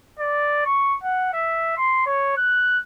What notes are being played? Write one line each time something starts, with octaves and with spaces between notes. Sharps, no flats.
D5
C#6
F#5
E5
C6
C#5
F#6